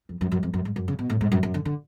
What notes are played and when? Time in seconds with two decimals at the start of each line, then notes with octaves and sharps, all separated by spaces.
0.09 F2
0.21 F#2
0.32 F#2
0.43 F2
0.54 F#2
0.65 G#2
0.76 F#2
0.88 C#3
0.99 B2
1.10 A2
1.21 G#2
1.32 F#2
1.43 F#2
1.54 D3
1.65 D3